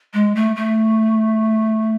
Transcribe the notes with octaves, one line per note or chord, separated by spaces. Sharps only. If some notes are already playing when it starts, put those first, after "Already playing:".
G#3
A3
A3